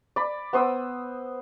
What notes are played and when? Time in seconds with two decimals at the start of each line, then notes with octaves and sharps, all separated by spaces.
0.16 D5 B5
0.53 B3 C5 D#6 E6